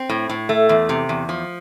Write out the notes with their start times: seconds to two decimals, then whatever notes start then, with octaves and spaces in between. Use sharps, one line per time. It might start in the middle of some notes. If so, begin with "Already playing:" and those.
Already playing: C4
0.09 A2
0.29 A2
0.49 A3
0.69 E2
0.89 C3
1.09 E2
1.29 F3